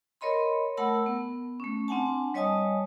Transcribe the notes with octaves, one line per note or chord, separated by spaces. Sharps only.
A#4 C#5 D#5 B5 C6
A3 A#4 F#5 A5 B5 E6
B3
A3 C#4
C4 D4 F#5 G#5 A5
G3 C#5 D#5 G#5 A5 D#6